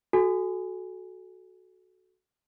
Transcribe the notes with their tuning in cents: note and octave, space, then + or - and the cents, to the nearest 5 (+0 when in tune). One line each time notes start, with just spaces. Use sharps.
F#4 +0 A4 -25 G#5 +0